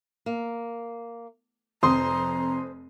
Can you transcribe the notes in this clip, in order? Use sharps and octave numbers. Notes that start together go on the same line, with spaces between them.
A#3
F1 F2 C5 A#5 C6 D#6